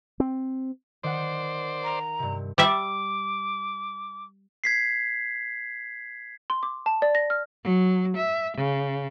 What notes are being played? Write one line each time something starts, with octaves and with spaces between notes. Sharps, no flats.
C4
D#3 C5 D5 F#5
A#5
G2 C3
G3 D5 E5 D6
G#6 B6 C7
C6
D6
A5
D5
A#6
F6
F#3
E5
C#3